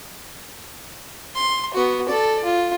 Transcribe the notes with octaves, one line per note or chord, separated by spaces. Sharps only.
C6
B3 F#4
A4 D5
F4